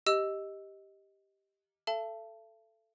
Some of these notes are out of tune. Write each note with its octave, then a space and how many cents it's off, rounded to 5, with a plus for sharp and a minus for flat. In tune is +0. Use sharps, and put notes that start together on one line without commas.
G4 +0 D#5 +10 E6 +0
A4 +0 E5 +45 A5 +5